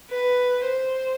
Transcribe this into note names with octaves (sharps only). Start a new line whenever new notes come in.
B4
C5